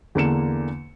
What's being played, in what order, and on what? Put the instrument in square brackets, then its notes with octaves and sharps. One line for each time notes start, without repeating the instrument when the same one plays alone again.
[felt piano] E2 D3 A#3 D4 C#7 E7